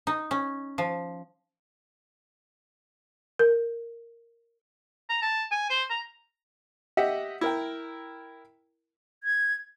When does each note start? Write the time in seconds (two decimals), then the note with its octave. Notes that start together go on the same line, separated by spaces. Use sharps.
0.07 D#4
0.31 C#4
0.78 F3
3.39 A#4
5.09 A#5
5.22 A5
5.51 G#5
5.70 C5
5.90 A#5
6.97 G4 D#5 E5 F#5
7.41 E4 A#4 G5
9.24 G#6